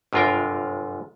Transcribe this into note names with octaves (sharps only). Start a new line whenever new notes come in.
G1 F#2 C3 F4 A#4 G5